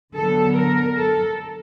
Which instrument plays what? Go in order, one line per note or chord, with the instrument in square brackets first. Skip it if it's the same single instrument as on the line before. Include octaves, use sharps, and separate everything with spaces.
[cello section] D3 F#3 B3 A4
A#4
A4